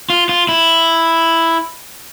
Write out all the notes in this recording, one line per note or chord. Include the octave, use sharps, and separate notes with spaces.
F4
F4
E4